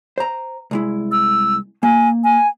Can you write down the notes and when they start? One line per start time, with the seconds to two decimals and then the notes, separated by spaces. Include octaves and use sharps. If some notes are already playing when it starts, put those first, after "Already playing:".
0.18 C5 A#5
0.71 C2 G#3 E4
1.12 E6
1.83 A#3 G#5
2.24 G#5